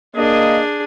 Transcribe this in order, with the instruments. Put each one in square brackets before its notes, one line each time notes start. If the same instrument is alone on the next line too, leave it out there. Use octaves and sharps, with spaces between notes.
[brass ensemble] A#3 D#5 [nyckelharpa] D4 G#4